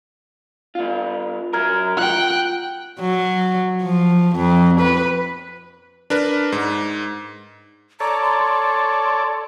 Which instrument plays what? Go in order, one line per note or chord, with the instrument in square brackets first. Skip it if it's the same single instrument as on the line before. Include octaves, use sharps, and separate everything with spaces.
[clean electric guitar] G2 F4
[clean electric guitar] F#3 A#4 [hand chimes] A#5 F6 G#6
[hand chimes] F4 [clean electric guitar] F#5 [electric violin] G5 F#6
[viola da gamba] F#3
F3
F2
B4
[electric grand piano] D4 A#4 B4
G#2
[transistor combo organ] A4 C#5 D5 [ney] A#5
[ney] C6
C6